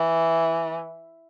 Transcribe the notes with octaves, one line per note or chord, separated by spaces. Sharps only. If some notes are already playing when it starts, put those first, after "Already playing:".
Already playing: E3